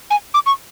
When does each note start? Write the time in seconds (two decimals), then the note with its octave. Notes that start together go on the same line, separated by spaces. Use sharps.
0.10 G#5
0.34 D6
0.46 C#6